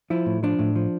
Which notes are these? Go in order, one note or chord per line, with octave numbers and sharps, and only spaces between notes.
F3 E4
A2
F3 D4
A2
F3